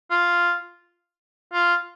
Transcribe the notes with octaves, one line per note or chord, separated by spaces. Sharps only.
F4
F4